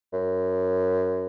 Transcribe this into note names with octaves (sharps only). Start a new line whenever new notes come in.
F#2